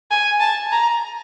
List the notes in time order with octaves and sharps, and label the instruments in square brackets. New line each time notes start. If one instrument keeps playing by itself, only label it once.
[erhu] G#5
A5
A#5